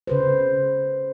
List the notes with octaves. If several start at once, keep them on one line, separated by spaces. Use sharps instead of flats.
C#3 B4 C5